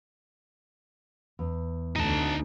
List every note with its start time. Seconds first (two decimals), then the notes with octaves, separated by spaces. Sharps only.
1.39 E2
1.96 D2 D#4 A5